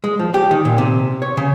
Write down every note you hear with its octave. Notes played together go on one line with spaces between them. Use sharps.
G#3
F3
G4
D#3
A#2
C3
C#5
C#3